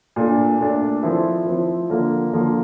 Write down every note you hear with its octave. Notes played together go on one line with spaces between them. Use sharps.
A#2 A3 D4
A#2 A3 D4
F3 C4 E4
F3 C4 E4
D3 F3 A#3
D3 F3 A#3